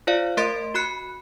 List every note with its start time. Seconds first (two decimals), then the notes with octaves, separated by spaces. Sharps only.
0.07 F4 C5 D5 F5
0.37 A3 A#4 D#5 C6 A6 D7
0.74 F#4 B5 F#6 C#7